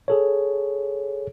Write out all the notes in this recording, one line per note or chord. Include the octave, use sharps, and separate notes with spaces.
G#4 A4 C#5